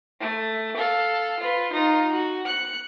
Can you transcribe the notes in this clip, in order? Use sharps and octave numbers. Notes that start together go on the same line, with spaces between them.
A3
A4 F5
F4 B4
D#4 F4
F#4
F#6 C#7